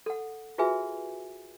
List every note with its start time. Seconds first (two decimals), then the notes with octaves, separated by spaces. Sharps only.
0.06 A4 F#5
0.58 F4 F#4 G#4 B4 E5 G#5